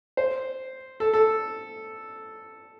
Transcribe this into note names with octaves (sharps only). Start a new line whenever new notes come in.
C5
A4
A4